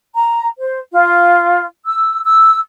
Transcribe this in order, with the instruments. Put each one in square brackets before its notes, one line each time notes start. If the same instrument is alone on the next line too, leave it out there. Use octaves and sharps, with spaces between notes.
[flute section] A#5
C5
F4
E6
E6